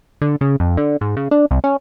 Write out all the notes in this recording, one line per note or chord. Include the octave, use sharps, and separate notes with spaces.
D3
C#3
F2
D3
G#2
C#3
D4
C2
C#4